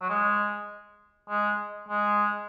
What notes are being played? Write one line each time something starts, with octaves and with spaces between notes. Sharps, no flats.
F#3
G#3
G#3
G#3